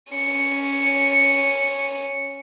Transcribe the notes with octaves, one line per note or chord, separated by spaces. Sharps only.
C#4 C#7